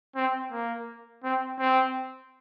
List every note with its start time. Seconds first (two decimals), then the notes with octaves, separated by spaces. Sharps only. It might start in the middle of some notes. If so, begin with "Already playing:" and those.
0.16 C4
0.52 A#3
1.24 C4
1.59 C4